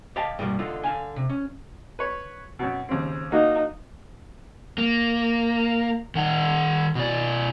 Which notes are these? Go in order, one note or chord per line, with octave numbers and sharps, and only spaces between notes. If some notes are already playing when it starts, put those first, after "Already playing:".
G4 D#5 F5 G5 A5
G2 B2 G3 A#3
D3 D#4 F4
D3 F5 G#5
C3
C#4
B4 C#5
F#2 B2
D#2 C#3 C4
A#3 D#4 F#4
A#3
D#3 F#5
B2 D5